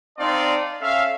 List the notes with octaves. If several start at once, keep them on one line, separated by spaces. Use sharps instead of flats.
C4 D#4 D5 F5 A5 C6
C#4 A4 E5 F5